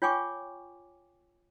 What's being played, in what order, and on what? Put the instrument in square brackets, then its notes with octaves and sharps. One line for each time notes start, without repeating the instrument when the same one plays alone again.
[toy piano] F4 C#5 G5 G#5 C#6 D6